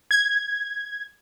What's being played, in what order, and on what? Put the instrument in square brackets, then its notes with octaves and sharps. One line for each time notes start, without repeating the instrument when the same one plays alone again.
[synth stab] G#6